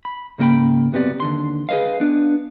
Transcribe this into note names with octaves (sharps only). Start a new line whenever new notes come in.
B5
G#2 C#3 A#3 G4 G5 B5
C2 F#2 B3 C4 G4 D5
D#2 D3 C6
G#4 B4 C5 D#5 F5
B3 D4